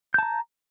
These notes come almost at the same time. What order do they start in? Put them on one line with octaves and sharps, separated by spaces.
G6 A5 A#5